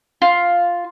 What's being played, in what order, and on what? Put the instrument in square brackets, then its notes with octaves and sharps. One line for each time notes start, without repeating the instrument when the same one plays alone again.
[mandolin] F4